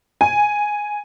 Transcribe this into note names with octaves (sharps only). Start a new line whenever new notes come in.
G#5